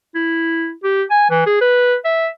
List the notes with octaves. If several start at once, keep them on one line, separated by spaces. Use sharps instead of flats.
E4
G4
G#5
E3
G#4
B4
E5